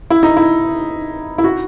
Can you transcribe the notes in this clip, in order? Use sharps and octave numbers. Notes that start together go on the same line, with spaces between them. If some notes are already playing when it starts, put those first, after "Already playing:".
E4
D#4
E4
E4
F#4